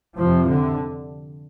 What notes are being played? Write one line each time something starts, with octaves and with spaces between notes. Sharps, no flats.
F2 C3 F3
D3